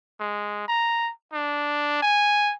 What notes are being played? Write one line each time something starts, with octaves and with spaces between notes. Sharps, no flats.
G#3
A#5
D4
G#5